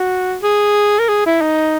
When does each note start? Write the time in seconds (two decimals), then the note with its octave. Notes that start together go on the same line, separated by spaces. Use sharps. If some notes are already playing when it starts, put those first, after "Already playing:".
Already playing: F#4
0.43 G#4
0.99 A#4
1.09 G#4
1.26 E4
1.41 D#4